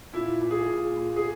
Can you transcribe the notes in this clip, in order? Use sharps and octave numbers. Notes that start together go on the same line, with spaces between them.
A#2 E4
A#2
G#4
A#2
A#2
G#4